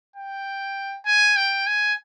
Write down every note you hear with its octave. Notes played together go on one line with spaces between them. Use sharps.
G5
G#5
G5
G#5